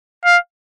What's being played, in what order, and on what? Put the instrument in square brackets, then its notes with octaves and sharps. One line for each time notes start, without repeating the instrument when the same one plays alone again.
[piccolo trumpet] F5